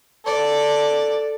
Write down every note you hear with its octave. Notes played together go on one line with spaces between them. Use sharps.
A4 D5